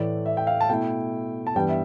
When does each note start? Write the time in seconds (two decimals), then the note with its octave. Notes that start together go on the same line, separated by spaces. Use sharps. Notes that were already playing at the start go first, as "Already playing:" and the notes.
Already playing: A2 E3 A3 D5
0.26 E5
0.37 G5
0.47 F5
0.61 A5
0.69 B2 A3 E4 G5
1.47 A5
1.55 G2 E3 G3 B3 G5
1.68 E5